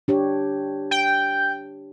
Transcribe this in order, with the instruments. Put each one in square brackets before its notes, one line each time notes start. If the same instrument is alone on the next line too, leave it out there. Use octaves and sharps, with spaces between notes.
[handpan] D4 G4 C#5
[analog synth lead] G5